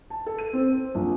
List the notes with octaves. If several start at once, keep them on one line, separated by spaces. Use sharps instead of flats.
A5
A4
D#7
C4
C5
A#1